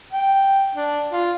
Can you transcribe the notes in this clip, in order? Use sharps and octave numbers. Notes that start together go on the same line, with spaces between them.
G5
D4
F4